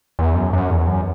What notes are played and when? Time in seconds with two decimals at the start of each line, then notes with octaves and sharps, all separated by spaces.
0.19 E2
0.35 F#2
0.53 F#2
0.71 E2
0.87 F#2